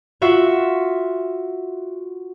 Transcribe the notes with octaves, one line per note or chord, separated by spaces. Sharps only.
F4 F#4 E5